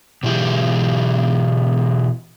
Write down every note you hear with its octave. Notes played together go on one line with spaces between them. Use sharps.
B2 E3 G#3 G4